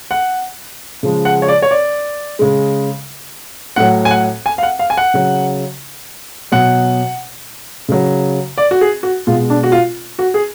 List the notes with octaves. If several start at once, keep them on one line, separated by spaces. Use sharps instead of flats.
F#5
C#3 F3 G#3
F#5
C#5
D5
C#5
D5
C#3 G#3
A2 F#3 F#5
G#5
F#5
G#5
F5
F#5
F5
G#5
F#5
C#3 F#3
B2 F#3 F#5
C#3 F#3
D5
F#4
G#4
F#4
B2 G#3 F4
D4
F#4
F4
F#4
G#4